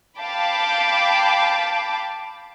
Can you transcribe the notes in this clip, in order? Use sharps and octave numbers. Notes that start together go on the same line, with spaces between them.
F5 G5 A5 B5 D6